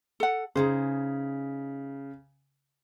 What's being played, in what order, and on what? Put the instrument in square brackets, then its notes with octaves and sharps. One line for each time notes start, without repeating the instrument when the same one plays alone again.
[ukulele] A4 F#5
[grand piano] C#3 [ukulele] D#4 G#4 C5